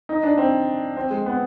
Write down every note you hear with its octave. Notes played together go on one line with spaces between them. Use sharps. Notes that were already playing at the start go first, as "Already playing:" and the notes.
D#4
D4
C4
C4
G#3
B3